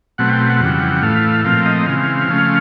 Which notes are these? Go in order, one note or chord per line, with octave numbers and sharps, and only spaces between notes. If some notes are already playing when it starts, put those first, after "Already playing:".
B2 F#3 A3 C4 F#5
G5
F#5
F2 C#3 E3 G3
A2 E3 A3 F5
A#2 F3 A3 C4 F5
D#5
C#3 E3 G#3 C4 F5
C#3 F3 A3 C#4